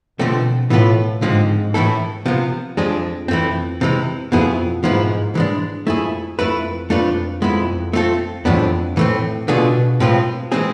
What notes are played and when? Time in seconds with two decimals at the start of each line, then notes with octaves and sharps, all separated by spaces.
0.19 B2 D3 F3 A3 C4
0.70 A2 E3 B3 F4 B4
1.22 G#2 D3 F3 G#3 C4
1.74 A2 E3 A3 E4 A4
2.26 C3 F3 B3
2.77 F2 F3 G#3 D4 G#4
3.28 F2 E3 A3 C4
3.81 C3 E3 G#3
4.32 F2 B2 B3 E4 G#4
4.83 G#2 F3 B3 E4 B4
5.35 E3 G#3 D4
5.87 F2 A3 E4 G#4
6.39 F2 A3 E4 B4
6.90 F2 A3 D4 F4 B4
7.42 F2 G#3 B3 E4
7.93 A3 C4 F4 A4
8.45 F2 A2 E3 G#3 B3 D4
8.96 A2 E3 A3 C4
9.48 B2 D3 A3 D4 F4 G#4
10.00 A2 G#3 C4 F4 B4
10.52 E3 G#3 C4 G#4